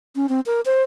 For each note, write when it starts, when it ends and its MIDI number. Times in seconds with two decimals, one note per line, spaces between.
0.16 0.29 61
0.29 0.40 60
0.46 0.61 70
0.66 0.82 72